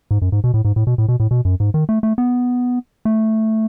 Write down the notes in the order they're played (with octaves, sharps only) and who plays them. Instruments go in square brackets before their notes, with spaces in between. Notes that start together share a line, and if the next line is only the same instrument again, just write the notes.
[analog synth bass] G#2
F#2
G#2
B2
A2
G#2
A2
B2
A2
B2
A2
B2
F#2
G#2
D#3
A3
A3
B3
A3